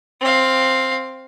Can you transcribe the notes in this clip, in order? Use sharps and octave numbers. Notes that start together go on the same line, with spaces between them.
C4 F5